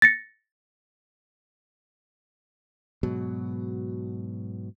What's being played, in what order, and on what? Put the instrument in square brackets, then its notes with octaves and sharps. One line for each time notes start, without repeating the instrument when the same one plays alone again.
[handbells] A6 A#6 C#7
[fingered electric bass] G#2 B2 F#3